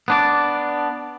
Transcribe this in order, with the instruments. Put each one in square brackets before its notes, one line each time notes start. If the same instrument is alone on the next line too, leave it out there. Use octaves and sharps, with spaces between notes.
[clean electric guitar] B3 D4 D5